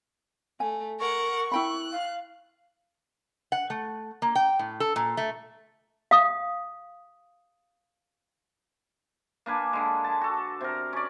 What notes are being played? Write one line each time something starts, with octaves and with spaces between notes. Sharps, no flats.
A3 G#5
A#4 F#5 C#6
E4 G5 B5 F#6
F5
F#5
A3
A#3
G5
A2
A4
A#2
A3
F5 D#6
A#3 D4 B4 G#5
D3 G#3
G#4 A5
F#4 A4
C3 A#4
C#4 D5